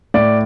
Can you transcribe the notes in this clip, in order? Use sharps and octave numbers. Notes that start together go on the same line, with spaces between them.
A2 D5